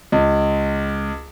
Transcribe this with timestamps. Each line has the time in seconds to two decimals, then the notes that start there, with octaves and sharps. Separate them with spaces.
0.12 C#2